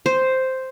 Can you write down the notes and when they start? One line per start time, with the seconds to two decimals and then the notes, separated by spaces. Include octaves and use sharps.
0.06 C5